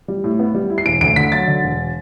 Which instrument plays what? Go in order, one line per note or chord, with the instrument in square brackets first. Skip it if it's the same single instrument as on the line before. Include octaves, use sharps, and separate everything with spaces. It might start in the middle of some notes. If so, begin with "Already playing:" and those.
[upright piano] G3
A2
B3
G3
E4
C7
E1 D7
D2 D7
D3 B6
F#3 A6
D3
E1